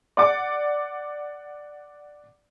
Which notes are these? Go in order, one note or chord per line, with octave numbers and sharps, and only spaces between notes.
D5 F#5 D6